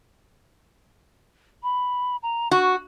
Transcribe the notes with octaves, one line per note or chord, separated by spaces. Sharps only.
B5
A#5
F#4 C#6